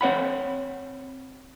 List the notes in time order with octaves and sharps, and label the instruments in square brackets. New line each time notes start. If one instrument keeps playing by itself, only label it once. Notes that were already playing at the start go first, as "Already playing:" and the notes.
[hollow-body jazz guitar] C4 C#5 F#5 B5